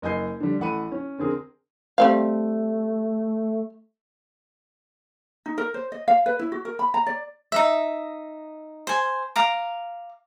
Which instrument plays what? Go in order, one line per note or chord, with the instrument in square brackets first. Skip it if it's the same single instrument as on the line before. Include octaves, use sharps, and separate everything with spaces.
[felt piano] F#1 D#5 G#5 G6 C7
D3 G3
A1 A4 F#5 B5 D#7
C#4
D3 C4 G#4 A#4
[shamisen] G3 C4 F5 [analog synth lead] A3
[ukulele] D#4
A#4
C5
D#5
F5
B4
E4
F#4
A#4
B5
A#5
D5
[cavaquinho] D#4 E5
C5 G#5
F5 A#5 D6